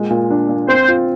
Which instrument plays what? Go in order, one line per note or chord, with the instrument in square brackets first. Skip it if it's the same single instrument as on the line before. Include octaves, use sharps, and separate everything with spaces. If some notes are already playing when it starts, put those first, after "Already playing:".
Already playing: [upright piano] A#2 G#3
A#2
D4
A#2
[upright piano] C4 [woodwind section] C5
[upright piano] F4